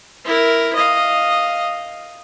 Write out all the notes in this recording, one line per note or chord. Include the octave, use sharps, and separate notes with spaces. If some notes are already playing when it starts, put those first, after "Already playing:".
E4 A#4
D#5 F5